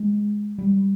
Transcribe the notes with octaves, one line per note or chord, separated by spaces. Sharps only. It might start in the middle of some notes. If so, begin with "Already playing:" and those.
Already playing: G#3
G3